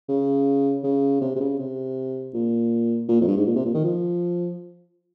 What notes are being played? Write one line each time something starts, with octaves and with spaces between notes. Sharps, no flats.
C#3
C#3
C3
C3
C#3
C3
A#2
A#2
F2
G2
G#2
A#2
C3
A#2
D#3
F3